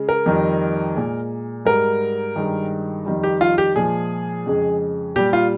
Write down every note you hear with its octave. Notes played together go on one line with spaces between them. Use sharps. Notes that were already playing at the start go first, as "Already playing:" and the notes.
Already playing: C#3 G#3
A#4
F2 D#3 G3
A#2 G#3
G#2 G3 A#4
G2 D#3 G#3
F2 D#3 G3
G4
F4
G4
A#2 F3 G#3 G#4
F2 C#3 G#3
A#2 G3 G4
F4